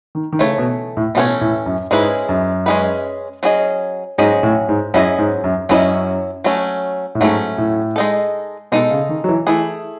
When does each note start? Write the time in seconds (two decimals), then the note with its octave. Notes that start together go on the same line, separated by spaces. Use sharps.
0.15 D#3
0.33 D#3
0.39 C#3 E3 A3 C#5
0.58 B2
0.97 A2
1.15 B2 E3 A3 C#4 F#4 C#5
1.41 A2
1.66 F#2
1.91 G#2 G#3 C#4 E4 G#4 B4
2.29 F#2
2.66 G#3 C#4 E4 G#4 B4
3.43 F#3 C#4 G#4 D#5
4.18 G#2 F#3 C#4 G#4 D#5
4.43 A2
4.69 G#2
4.94 F#2 F#3 C#4 E4 G#4 D#5
5.18 G#2
5.44 F#2
5.69 F#2 F#3 C#4 E4 G#4 D#5
6.44 F#3 A3 C#4
7.15 A2
7.20 G#2 F#3 A3 C#4
7.58 A2
7.96 G#3 D#4 A4
8.72 B2 G#3 D#4 A4
8.91 C#3
9.09 D#3
9.24 F#3
9.29 E3
9.47 E3 A3 E4 G#4